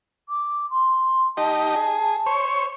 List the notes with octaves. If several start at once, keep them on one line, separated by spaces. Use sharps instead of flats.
D6
C6
D#4 G4 D#5 A5
G#4
C5 C#5 C#6